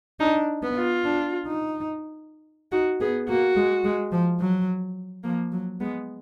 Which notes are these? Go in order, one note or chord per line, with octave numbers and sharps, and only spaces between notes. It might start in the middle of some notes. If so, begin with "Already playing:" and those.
D4 D#4
B3
F4
D4
D#4
D#4 F#4
B3 G#4
A#3 F#4
G#3
G#3
F3
F#3
F3 A#3
F#3
G#3 B3